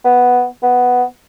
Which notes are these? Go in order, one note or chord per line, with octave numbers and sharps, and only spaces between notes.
B3
B3